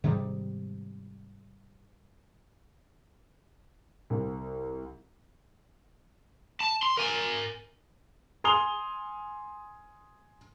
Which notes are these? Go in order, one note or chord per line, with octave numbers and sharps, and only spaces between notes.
G#2 C3 D#3 G3
C2
A5
C6
A#4 G#5
G#5 C6 D#6 F7 G7